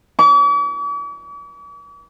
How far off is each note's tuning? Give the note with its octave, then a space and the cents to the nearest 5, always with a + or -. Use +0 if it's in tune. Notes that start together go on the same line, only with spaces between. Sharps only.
D6 -45